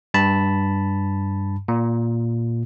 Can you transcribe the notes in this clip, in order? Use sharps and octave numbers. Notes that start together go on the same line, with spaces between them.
G2 A5 B5
A#2